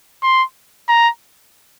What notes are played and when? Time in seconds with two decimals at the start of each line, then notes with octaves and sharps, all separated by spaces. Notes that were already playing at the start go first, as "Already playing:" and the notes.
0.23 C6
0.89 A#5